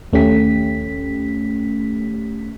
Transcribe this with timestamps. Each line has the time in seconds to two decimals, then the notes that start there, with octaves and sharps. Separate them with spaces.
0.13 D#2 A3 C#4 G4 B6